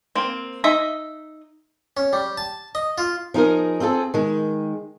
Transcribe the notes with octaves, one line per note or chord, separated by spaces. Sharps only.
A#3 C4
D#4 D#5 E5
C#4
G3
A5
D#5
F4
F3 D#4 G#4 A#4
C4 F4 G#4 A4
D#3 G#3